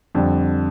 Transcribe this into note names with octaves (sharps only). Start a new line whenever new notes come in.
F2 D3 G3